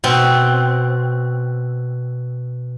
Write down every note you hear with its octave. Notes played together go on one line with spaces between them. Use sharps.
B2 C4